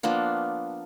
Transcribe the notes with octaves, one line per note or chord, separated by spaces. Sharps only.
F3 A#3 B3 D4